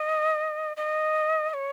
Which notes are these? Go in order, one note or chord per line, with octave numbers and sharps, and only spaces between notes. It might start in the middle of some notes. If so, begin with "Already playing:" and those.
Already playing: D#5
D#5
D#5
C#5